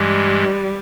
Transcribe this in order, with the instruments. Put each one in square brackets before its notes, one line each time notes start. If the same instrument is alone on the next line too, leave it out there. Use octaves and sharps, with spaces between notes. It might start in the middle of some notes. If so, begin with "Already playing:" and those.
Already playing: [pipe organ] G2 E3 G#3 [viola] G3